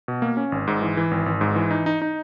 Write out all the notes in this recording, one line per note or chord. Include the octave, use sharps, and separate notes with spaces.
B2
A#3
C#4
G#1
G#2
E3
E3
G#1
G#1
G#2
E3
D#4
D#4
D#4